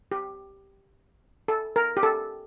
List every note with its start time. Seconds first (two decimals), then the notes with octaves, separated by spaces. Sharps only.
0.12 G4
1.48 A4
1.76 A#4
1.97 G4
2.03 A4